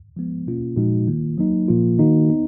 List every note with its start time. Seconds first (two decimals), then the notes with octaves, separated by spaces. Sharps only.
0.17 F3 G#3 B3
0.47 B2 A#3 C#4 F4
0.76 A#2 F3 G#3 D#4 F#4
1.08 D#3 A#3 F4
1.38 F#3 A#3 D#4
1.68 A#2 F3 A#3 F4
1.99 D#3 A#3 D#4 F#4
2.30 B3 D#4